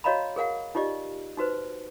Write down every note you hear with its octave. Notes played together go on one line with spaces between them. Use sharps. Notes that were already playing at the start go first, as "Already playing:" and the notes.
F#4 C#5 D#5 F5 A#5 B5
G#4 A#4 F5 F#5
D#4 F4 G4 D5 D#5
D#4 F#4 B4 C5